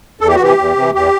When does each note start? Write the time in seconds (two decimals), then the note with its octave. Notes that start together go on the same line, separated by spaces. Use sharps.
0.21 E2 A4
0.28 G4
0.35 F#4
0.39 C3 E3 G4
0.58 E2
0.76 C3 E3
0.94 E2 G4